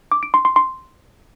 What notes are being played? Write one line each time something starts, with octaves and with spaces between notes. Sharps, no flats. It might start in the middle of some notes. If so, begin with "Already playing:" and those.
D6
D7
C6
C6
C6